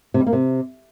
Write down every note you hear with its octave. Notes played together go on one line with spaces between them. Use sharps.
C3
G3
A#3
C3